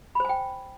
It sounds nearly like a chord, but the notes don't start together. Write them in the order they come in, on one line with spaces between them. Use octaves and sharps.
B5 C5 G#5 G5